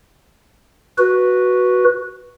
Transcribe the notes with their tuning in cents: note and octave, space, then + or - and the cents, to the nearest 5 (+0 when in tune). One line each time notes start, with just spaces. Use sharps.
F#4 +0 B4 -10